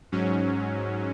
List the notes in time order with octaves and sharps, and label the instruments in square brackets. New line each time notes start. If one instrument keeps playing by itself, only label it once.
[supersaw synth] G#2 F#3 C#4